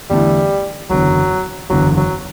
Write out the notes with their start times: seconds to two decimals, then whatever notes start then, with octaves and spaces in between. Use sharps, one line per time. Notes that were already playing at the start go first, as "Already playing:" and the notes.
0.10 E2 D3 G3 A3 E4
0.90 F#1 E2 D3 F#3
1.70 F#1 E2 D3 F#3
1.97 F#3